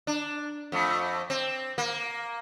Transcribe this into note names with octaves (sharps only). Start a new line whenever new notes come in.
D4
F2 A3
C4
A#3